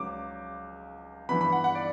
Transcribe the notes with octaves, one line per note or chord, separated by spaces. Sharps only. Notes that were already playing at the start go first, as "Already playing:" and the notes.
Already playing: C#2 C#3 F#3 D6
G2 E3 B3 B5
B5
F#5
F#5
D5